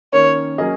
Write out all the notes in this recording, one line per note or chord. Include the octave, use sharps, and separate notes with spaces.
D#3 A#3 C#4 C#5
F#3 A#3 C#4 G#4 D#5